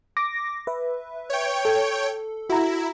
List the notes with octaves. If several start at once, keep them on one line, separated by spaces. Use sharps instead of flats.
D6 A#6
B4 E5
C#5 G5
A4
E4 F#4 A#5